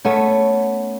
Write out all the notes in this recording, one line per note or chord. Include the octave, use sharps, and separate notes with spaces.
A3 B3 C#4